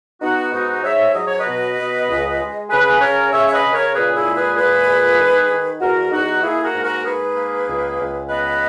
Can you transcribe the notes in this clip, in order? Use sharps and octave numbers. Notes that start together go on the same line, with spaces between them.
B3 D#4 F#4
G#2 D#4 F#4
G#2 C#5 E5
F#3 D#5
C#5
B4 D#5
B2
B2
C#2
G#3
C#3 G#4 B4
C#4 A#4 C#5
C#3 C#5 E5
E5
B4 D#5
C#3
A#4 C#5
A#2 G#4 B4
E4 G#4
G#3
G#4 B4
A#2 G#4 B4
G#3
D#3
D#3
E2 F#4 A#4
E2 D#4 F#4
A#3 E4 G#4
F#4 A#4
G#2
F#4 A#4
G#2 G#4 B4
A#3
C#2
C#2
B3 B4 D#5